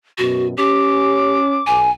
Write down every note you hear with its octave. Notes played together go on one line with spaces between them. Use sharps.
F#2 B2 F#4
C#4 G4 D6
B1 G#5